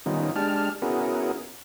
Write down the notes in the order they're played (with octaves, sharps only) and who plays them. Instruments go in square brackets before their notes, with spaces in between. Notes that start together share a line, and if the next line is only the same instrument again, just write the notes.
[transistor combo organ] D#3 G3 B3 C#4 D#4 F4
G#3 D4 G4 A5 F6
B3 C#4 E4 F#4 G#4 A#4